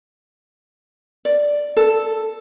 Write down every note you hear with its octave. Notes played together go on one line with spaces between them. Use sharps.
D5
A4